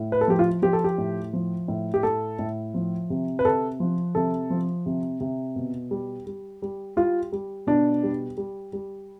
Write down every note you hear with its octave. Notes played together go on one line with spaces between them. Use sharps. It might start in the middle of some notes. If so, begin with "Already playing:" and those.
Already playing: A2
B4
A4
F3 G4
F4
F3 G4
A4
G4
A2
F3
A2
G4
A2 A4
A2
F3
C3
B4
C3 A4
F3
C3 A4
F3
C3
C3
B2
G3
G3
G3
G3 F4
G3
B2 D4
G3
G3
G3